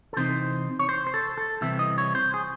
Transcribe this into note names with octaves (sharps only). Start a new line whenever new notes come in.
A4
C3 E3 C4 D#4 C5
C#5
C5
C5
A4
A4
C2 C3 E3 C4 E5
D#5
C#5
C5
G#4